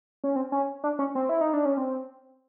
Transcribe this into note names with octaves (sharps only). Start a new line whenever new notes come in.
C#4
C4
C#4
D4
C#4
C4
E4
D#4
D4
C#4
C4